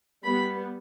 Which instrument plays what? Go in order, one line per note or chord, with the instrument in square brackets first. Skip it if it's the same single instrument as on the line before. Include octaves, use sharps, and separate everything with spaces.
[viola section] G3 B3 B5